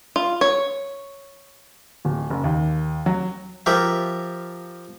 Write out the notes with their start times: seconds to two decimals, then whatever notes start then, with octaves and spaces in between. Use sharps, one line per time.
0.16 F4
0.41 C#5
2.05 D1
2.30 F#1
2.44 D#2
3.06 F#3
3.66 F3 G4 A#4 E5